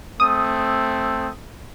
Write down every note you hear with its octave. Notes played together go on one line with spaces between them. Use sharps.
A3 C4 D#6